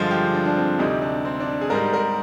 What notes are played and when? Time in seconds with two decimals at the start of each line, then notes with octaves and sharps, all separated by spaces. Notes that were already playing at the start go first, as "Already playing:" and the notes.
Already playing: G2 D3 F3 G#3 F4
0.11 G4
0.34 D4
0.45 D4
0.57 C4
0.79 D2 C3 G3 D#4
1.02 D4
1.25 C4
1.40 D4
1.61 G#4
1.70 G#2 G3 A#4
1.93 A#4